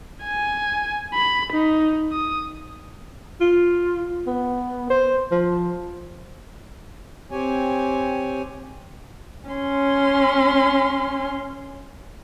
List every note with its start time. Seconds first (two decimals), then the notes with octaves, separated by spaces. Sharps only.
0.24 G#5
1.14 B5
1.53 D#4
2.12 D#6
3.41 F4
4.27 B3
4.90 C5
5.31 F3
7.31 C4 G4 C#5 G#5
9.50 C#4 C6